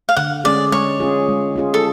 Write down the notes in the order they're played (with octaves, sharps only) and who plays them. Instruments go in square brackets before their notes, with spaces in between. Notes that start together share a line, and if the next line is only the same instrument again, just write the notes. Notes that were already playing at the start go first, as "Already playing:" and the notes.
[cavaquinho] F5
[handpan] D3 [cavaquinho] F#5
[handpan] G#3 C#4 G#4 [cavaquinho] D5
[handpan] G#3 [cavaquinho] C#5
[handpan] C#4 F4 G#4
G#3
C#4 F4 G#4
[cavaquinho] A4